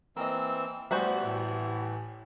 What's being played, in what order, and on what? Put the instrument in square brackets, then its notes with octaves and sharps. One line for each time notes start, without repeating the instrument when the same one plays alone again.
[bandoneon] E3 C4 E6 [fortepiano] A#3 D#5
[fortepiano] A1 G3 [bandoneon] E3 [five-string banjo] B3 F#4 C5
[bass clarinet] A2